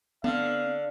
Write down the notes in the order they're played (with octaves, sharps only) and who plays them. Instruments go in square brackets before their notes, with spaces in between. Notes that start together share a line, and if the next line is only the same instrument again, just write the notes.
[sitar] D3 [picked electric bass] B3 C4 [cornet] F5